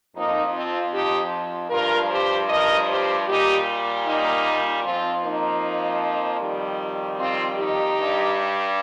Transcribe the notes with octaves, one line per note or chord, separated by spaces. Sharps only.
F2 F3 A#3 D#4
C4 F4
D#4 G4
G2 F3 F4 A#4
G4 C5
A#4 D#5
G4 C5
A#2 G3 D#4 G4
A#3 D#4
F2 F3 C4 F4
A#3 D#4
F2 D#3 G3
C4 F4
D#4 G4
G2 G3